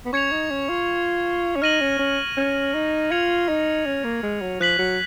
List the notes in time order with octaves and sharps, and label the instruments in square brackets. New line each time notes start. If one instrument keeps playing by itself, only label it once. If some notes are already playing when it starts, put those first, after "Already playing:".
[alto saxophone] B3
[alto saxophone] C#4 [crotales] C#6 G#6 C#7 F7
[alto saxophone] D#4
C#4
F4
C#4
[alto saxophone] D#4 [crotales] F6 A#6 D#7 F#7
[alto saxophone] C#4
C#4
C#4
D#4
[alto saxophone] F4 [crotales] G#6 C#7 F7
[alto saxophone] D#4
C#4
A#3
G#3
F#3
[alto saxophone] F3 [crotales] F#6 B6 F#7
[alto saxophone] F#3